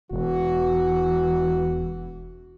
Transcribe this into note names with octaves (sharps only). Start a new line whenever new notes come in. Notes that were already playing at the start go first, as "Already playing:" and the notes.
E1 E3 F#4